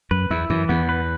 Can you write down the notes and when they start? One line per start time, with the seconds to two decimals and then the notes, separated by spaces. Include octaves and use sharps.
0.11 F#2 B4
0.30 E2 E4
0.50 F#2 E3
0.69 E2 B3
0.89 B4